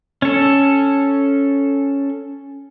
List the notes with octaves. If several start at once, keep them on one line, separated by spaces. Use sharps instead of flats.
C#4 A4